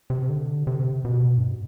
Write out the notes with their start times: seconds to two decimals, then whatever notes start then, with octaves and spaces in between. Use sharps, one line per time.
0.10 C3
0.29 D3
0.67 C3
1.05 B2
1.38 G2